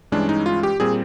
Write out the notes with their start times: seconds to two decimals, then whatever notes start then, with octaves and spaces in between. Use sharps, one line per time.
0.12 G2 E3 G#3 C#4 D4
0.29 D#4
0.46 F4
0.63 G4
0.80 A#2 G3 C4 G#4